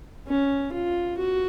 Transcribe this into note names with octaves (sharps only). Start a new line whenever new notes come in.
C#4
F4
F#4